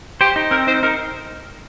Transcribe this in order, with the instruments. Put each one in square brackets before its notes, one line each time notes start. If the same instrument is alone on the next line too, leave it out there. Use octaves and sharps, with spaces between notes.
[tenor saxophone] G4 [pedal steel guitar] C5
[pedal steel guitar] D#4
[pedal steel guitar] C4 [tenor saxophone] A#4
[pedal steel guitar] D#4 [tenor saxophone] C5
[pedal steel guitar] D#4 [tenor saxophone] A#4